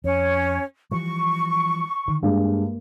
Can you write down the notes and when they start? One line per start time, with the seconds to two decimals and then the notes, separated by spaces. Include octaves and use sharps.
0.04 F2 C#4 C#5
0.91 E3 F3 G3 C#6
2.08 D3 D#3
2.23 G2 G#3 A#3